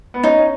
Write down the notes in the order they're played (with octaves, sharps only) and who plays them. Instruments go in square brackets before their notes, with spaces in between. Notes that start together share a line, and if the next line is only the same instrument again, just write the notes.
[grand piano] B3
[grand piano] C#4 [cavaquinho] D#4
[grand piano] C#4